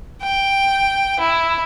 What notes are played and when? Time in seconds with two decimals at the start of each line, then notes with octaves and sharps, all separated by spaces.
0.23 G5
1.20 E4